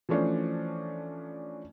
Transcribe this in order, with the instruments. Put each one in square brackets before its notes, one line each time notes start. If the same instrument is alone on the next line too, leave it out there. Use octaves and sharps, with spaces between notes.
[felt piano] E3 F3 A3 C#4 D4 C5